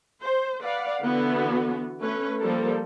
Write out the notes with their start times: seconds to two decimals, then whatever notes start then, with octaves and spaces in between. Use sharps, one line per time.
0.20 C5
0.63 B4 D5 F5 F#5
1.02 D3 E3 B3 F#4
2.01 A3 C#4 B4
2.38 F3 G3 A#3 A4 A#4